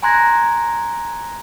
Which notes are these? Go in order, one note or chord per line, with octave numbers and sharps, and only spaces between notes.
G#5 A#5 C6 F#6 G#6 A#6